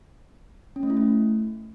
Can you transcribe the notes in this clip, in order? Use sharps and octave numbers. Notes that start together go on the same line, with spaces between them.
C#4
A3
E4
A3